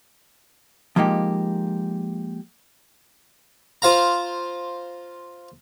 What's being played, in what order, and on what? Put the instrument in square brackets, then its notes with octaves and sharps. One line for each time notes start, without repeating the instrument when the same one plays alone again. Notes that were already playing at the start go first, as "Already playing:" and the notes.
[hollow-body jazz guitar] F3 G#3 A#3 D#4 G4
[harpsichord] F4 C5 F5 A#5